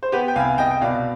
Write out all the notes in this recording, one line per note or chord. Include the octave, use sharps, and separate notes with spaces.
C5
B3 G4 B4
G5
C2 F5 G#5
C2 D#5 G5
G5
B2 D5 F5